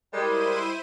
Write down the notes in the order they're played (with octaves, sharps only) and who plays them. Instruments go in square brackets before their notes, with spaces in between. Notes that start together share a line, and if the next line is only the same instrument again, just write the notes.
[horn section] G3 G#3 [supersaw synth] E4 C5 D#7 [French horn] A#4